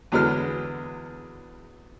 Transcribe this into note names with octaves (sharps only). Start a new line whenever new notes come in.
E2 D3 F#3 G#3 B3 F6